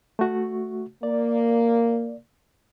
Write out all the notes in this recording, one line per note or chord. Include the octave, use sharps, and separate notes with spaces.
A3 F#4
A#3 D5